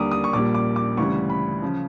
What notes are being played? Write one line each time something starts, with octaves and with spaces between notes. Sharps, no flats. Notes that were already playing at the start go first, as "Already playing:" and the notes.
Already playing: D#2 D3 G3 A#5 D6 D#6
D#6
C#6
A#1 A#2 G3 D6
D6
D6
D2 C#3 E3 G3 C#6
B5
C#3 F3